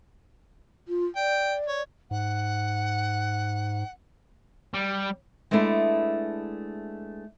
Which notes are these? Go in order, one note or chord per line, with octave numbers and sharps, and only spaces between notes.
F4
D5 G5
C#5
G#2 F#5
G3
G#3 A3 B3 D4 E4